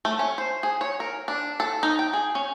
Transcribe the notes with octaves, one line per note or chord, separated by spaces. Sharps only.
A3
C#4
C5
G#4
C#5
A#4
D4
A4
D#4
G5
G#4
C#4